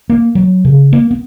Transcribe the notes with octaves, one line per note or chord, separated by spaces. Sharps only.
A#3
F#3
C#3
A#3
B3